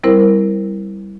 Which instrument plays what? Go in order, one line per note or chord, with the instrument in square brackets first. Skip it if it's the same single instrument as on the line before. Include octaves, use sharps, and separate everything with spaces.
[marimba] G3 C4 E4 A#4 C5